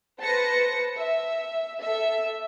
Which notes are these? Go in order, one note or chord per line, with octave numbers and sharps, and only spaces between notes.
B4 C5 A5 A#6 C#7
E5
A4 E5